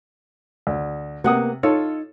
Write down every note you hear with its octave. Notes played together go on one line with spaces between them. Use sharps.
D2
C3 A#3 B3 F#5 D#6
D#4 F4 A4 C#5